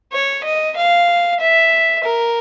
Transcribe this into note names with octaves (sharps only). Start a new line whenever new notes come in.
C#5
D#5
F5
E5
A#4